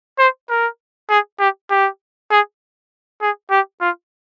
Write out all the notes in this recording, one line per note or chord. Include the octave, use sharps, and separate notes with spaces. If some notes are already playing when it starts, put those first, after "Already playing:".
C5
A#4
G#4
G4
G4
G#4
G#4
G4
F4